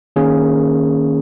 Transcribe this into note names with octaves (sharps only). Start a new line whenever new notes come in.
D#3 A#3 C#4 G#4